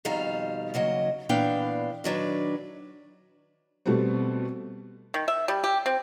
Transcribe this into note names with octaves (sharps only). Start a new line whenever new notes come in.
F2 B2 D#3 G3 F5 A#5
D#2 C#3 F#3 D#5
A#2 E3 B3 D4 F5 G5
D#3 F#3 D4 B4 D5
B2 G3 A3 B3 C4
D#3
E5
G3
G4
C4